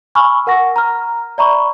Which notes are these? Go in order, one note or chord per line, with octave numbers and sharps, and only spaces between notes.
G#5 B5 C#6 E6 F6
A#4 F#5 C#6 A#6
A#5 F6
D5 E5 A#5 B5 C#6